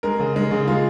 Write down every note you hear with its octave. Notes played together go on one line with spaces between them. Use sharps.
G#3 A#4
C#3
G#3
C#3
D#4
G#3 F4